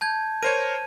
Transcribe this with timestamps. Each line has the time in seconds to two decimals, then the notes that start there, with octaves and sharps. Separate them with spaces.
0.01 A5 G6 G#6
0.43 A#4 C5 C#5 G#6 D#7